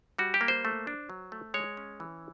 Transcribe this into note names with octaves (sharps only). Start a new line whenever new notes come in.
G3 F#4
G4
A#3
C5
A3
D4
F#3
A3
G#3 C#5
C#4
E3